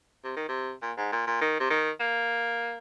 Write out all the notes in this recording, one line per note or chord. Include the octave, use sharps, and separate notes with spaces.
C3
D#3
C3
A#2
G#2
A#2
A#2
D#3
C3
D#3
A#3